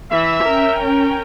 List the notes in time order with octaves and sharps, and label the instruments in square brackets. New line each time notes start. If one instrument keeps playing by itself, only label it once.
[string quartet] E3 [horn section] E5
[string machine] C#4 G5 [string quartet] A#4